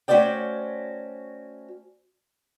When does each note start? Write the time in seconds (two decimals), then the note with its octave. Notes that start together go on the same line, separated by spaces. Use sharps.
0.08 A3 C#4 F#4 C5 D5 G5